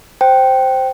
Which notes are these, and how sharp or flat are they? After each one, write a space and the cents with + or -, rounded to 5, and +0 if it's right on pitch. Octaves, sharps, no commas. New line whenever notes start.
C5 +0 G5 -10